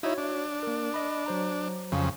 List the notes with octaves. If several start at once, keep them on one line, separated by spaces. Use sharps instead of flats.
D#4 E4 F#4 C#5
D4
A#3 A#4
D#5 B5
F#3 C5 A#5
F2 C#3